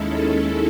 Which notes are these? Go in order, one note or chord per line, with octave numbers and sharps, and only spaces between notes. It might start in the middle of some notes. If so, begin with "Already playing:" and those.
Already playing: D#2 D#3 G#3 C#4 E4 A4
A4